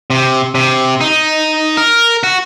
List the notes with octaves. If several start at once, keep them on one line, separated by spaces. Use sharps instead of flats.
C3
C3
D#4
A#4
F#4